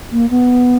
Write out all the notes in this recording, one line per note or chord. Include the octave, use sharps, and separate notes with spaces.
A#3
B3